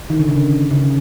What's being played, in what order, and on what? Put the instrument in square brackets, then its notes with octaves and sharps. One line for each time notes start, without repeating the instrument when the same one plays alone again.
[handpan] D#3
D3
C#3
C#3